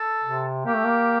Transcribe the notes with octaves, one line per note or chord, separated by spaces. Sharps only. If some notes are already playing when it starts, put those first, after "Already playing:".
Already playing: A4
C3
A#3 G4
A3
A#3